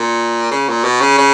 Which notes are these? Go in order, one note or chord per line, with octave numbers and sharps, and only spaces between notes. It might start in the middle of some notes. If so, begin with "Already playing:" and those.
Already playing: A#2
C#3
A#2
B2
C#3
C#3